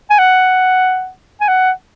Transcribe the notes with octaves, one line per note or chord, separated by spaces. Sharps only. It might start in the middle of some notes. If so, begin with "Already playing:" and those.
G#5
F#5
G#5
F#5